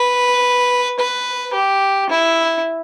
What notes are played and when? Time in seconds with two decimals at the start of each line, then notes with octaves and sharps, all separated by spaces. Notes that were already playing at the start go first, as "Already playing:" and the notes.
Already playing: B4
0.99 B4
1.54 G4
2.10 E4